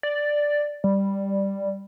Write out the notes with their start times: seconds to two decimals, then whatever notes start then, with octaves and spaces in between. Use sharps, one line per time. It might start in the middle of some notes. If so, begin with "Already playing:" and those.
0.03 D5
0.84 G3